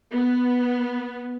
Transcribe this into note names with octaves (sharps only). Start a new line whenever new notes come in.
B3